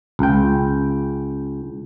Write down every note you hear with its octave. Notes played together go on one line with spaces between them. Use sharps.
C#2 G5